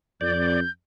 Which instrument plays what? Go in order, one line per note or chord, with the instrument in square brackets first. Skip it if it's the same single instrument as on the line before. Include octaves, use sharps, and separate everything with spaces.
[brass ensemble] F2 [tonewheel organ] D5 [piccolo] G6